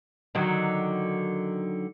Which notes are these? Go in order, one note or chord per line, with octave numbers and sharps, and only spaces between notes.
D3 D#3 F#3